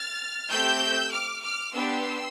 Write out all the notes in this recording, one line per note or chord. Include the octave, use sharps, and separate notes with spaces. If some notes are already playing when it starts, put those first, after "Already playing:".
Already playing: F6 A6
A3 C4 G4 E6 G6
D6 F6
D6 F6
B3 D4 G4 C6 E6